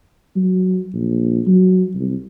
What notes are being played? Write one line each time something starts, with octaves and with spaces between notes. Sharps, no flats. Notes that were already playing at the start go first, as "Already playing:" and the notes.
F#3
A#1
F#3
C2